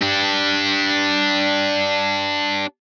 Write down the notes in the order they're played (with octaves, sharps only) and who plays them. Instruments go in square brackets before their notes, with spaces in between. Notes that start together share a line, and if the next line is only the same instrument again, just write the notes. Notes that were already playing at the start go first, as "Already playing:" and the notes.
[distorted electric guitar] D4 G4